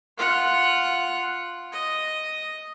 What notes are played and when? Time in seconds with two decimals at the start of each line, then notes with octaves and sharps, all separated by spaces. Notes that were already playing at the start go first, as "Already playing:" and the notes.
0.18 F4 F#5
1.72 D#5